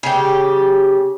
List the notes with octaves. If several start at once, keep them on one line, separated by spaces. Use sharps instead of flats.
C#3 G4